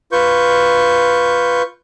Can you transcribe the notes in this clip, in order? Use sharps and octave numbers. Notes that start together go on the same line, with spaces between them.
F4 B4 C#6 G6